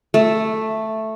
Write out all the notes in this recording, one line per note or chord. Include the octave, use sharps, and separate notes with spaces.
A3